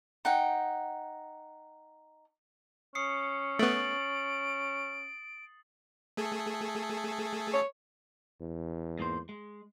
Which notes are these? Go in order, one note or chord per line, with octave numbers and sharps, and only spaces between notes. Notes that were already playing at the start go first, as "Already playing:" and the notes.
D#4 F#5 G5
C#4 D#6 C7 C#7
A3 B3 A6 D7 F#7
A3 G#4 A4
C#5
E2
G#2 A#3 C5
G#3